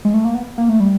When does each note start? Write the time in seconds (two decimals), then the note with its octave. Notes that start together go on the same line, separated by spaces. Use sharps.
0.05 G#3
0.14 A3
0.25 A#3
0.34 B3
0.58 A#3
0.69 A3
0.80 G3